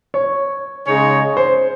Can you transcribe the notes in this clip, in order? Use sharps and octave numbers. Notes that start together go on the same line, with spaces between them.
C#5
C#3 G#3 D#4 G#4 C#5
C5